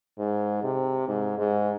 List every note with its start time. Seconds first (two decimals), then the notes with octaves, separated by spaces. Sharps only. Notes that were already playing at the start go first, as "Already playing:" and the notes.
0.19 G#2
0.64 C3
1.08 G#2
1.39 G#2